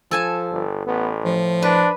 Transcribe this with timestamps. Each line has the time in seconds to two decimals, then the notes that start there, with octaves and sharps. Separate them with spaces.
0.11 F3 A4 G#5 A5
0.51 G1
0.87 A1 B3
1.25 A2 F3
1.62 D4 B4